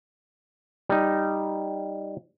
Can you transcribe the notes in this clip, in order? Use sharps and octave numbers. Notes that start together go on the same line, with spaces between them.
G3 D#4